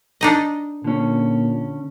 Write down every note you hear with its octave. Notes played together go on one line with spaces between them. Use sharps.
D4 D#4 D#5
A#2 D3 C#4